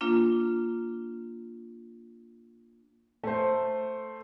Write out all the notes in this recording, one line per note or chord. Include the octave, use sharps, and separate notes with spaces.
A#3 D4 F4
A3 C5